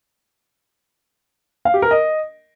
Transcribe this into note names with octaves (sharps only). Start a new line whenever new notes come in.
F5
G4
A#4
D#5